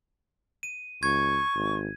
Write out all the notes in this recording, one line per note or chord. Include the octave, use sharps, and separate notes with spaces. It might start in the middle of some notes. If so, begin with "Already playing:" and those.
D#7
C#2 C#6 G#6
G#1